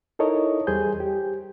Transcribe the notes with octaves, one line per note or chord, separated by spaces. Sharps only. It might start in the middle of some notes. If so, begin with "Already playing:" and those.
D#4 E4 A4 A#4 C#5 D#5
E2 G3 G#4 C5 G#5 G6
G4